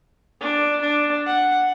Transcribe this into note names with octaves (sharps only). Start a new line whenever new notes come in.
D4
D4
F#5